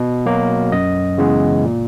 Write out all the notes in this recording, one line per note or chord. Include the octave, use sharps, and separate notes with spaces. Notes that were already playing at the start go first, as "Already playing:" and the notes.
Already playing: B2
F#3 A#3
F#2 D#5
C#3 E3 G#3 B3
A#2